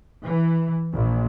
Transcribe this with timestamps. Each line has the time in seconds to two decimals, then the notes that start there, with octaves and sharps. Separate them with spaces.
0.23 E3
0.93 A#1